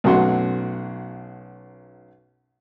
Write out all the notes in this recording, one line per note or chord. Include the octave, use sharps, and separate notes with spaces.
B1 F#2 A3 F#4 C6